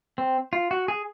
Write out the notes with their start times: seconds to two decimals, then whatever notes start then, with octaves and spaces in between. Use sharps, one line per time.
0.18 C4
0.53 F4
0.71 F#4
0.88 G#4